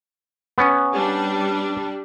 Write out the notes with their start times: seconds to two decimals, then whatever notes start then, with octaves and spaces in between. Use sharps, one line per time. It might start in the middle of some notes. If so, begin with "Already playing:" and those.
0.58 B3 C#4
0.92 G3 D4